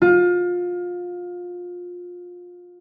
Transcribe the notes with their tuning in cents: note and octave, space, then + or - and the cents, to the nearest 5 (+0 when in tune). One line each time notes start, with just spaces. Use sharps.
F4 +25